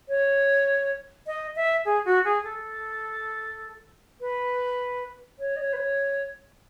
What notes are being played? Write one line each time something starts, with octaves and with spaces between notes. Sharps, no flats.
C#5
D#5
E5
G#4
F#4
G#4
A4
B4
C#5
D#5
C#5
B4
C#5